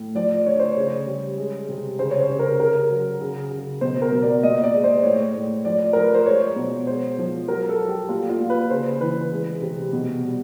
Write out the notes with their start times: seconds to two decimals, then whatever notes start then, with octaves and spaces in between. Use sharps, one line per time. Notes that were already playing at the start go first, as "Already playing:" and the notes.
Already playing: A2
0.15 F3 D5
0.46 D3 C#5
0.59 C5
0.71 C#5
0.77 C#3
1.06 G3
1.38 G#3
1.69 C3
1.99 C#3 C5
2.11 C#5
2.19 C5
2.29 C#3
2.39 A#4
2.59 C#3 A#4
2.90 F#3
3.21 C#3
3.51 C#3
3.81 B2 C5
4.02 A#4
4.12 B2
4.22 D5
4.43 A#2 D#5
4.63 D5
4.74 G#3
4.84 C5
5.03 A2 C#5
5.35 A2
5.65 F3 D5
5.93 F3 A#4
6.04 B4
6.14 C5
6.26 G#3 C#5
6.56 B2
6.87 G#3 C5
7.18 F3
7.48 F#3 A#4
7.69 A4
7.79 F#3
7.89 G4
8.09 A#2 F4
8.29 F4
8.40 A#2
8.50 B4
8.70 C#3 C5
9.01 E3 B4
9.31 G#3
9.62 C3
9.93 B2
10.23 G3